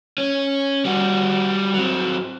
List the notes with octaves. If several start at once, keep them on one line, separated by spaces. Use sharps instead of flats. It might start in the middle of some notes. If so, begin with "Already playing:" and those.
C#4
G3 F#4
F#3 C4